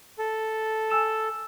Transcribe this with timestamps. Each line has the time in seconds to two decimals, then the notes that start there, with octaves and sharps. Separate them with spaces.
0.19 A4
0.90 G#5 E6 E7